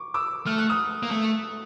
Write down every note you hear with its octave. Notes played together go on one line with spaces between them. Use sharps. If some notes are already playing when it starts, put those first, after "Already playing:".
Already playing: C#6 D6
D6 E6
A3 F6
F#6
D#6 F6
A#3
A3